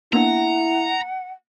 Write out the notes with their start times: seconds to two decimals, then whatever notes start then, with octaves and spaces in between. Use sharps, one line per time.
0.13 A#3 B3 D4 E4 F#5 A#5